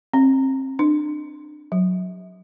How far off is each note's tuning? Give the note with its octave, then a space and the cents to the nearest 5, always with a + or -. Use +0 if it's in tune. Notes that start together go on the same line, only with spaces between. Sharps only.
C4 +35
D4 +30
F#3 -15